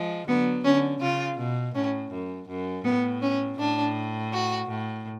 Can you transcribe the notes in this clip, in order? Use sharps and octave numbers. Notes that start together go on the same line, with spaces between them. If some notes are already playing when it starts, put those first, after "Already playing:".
Already playing: F3 G#3
D3 F#3 B3
D3 C#4
C#3 F4
B2
A2 C#4
F#2
F#2
A2 B3
C#4
A2 D4
F#4
A2